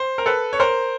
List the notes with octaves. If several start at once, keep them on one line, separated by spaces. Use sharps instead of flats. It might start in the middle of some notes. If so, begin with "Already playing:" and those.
Already playing: C5
A#4
A4 B4
C#5
A#4 C5